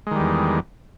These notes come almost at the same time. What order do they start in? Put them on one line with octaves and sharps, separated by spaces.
G#3 D#3 G3 E2